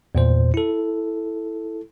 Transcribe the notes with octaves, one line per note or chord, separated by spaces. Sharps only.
E2 A#2 C5
E4 A4